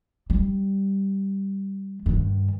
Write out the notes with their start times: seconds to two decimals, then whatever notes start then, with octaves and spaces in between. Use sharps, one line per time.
0.30 G3
2.06 G2 D#3